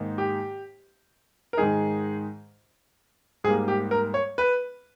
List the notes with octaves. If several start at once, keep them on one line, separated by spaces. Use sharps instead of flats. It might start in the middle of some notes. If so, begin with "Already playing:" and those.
Already playing: G#2 D#3 A#3 D#4
G4
A#4
G#2 D#3 G#3 D#4 G#4
G#2 G3 A#3 G#4
G4
A#4
C#5
B4